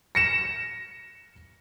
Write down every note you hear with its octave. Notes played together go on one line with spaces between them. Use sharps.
A#6 C#7 E7